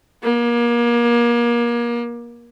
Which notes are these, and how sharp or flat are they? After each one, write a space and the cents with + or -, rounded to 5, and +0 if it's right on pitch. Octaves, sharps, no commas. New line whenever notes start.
A#3 +30